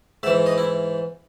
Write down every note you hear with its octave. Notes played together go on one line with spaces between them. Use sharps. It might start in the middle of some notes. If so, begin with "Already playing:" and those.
G#2 E3 E5
D#5
E4